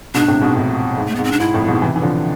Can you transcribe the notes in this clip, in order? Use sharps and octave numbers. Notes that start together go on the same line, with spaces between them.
G#2 B2 D4
A2 C3
G#2 B2
F2 A2
G#2
A3
B3
G#2
C4
D4
G#2 E4
F2 A2
G#2 B2
C3 E3
E3
D3 F3